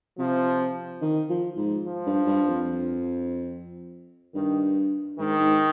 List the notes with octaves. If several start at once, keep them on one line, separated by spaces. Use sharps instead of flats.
C3 F3
D#3
F3
G#2
F3
G2
G2
F2
G2 D#3
G#2 D#3
G#2